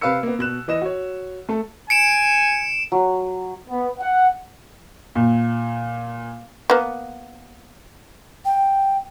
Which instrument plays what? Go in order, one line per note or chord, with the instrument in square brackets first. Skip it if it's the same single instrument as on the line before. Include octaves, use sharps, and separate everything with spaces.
[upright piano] C3 B4 F5 B5 E6 C#7
A#3 B3
B2 F#6 E7
E3 D#5 E7
F#4 C#5
A3 A4
[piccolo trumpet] G#5 [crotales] C#7 D7 E7
[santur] F#3
[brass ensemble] B3
F#5
[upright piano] A#2
[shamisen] A#3 B3
[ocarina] G5